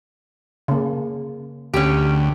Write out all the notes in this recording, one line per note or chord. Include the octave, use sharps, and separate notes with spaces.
C#3 A#3
D2 C#4 G4